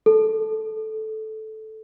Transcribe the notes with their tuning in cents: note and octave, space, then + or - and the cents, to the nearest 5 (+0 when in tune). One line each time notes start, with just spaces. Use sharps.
A4 -10